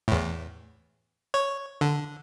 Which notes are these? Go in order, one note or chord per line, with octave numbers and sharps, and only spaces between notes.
E2 A2
C#5
D3